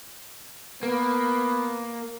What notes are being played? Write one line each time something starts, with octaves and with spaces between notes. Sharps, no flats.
A#3 B3